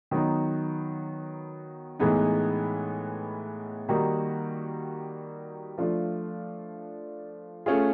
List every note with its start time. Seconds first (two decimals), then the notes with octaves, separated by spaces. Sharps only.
0.11 D#3 F#3 B3 D#4
1.99 A2 E3 G#3 B3 D#4
3.89 D#3 G3 A#3 D#4 F#4
5.78 F3 A3 D4 F4
7.66 A3 C#4 F4 G#4